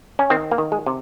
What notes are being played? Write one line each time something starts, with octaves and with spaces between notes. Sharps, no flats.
C#4
D#3 C4
A#3
D#3
G#3
C3